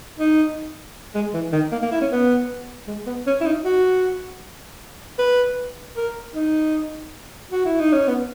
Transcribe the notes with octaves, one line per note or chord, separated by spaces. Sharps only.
D#4
G#3
E3
D#3
A#3
A#3
E4
C#4
B3
G#3
B3
C#4
E4
D#4
F#4
B4
A#4
D#4
F#4
E4
D#4
C#4
B3